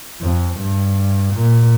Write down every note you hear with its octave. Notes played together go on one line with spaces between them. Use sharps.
F2
G2
A#2